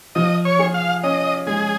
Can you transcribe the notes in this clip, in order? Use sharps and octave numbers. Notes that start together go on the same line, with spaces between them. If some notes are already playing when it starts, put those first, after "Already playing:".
F3 D#5
C#5
G#4
F5
C#4 D#5
G#3 G#4